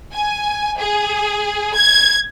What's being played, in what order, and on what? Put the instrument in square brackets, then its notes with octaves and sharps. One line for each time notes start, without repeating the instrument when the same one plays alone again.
[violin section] G#5
G#4
G#6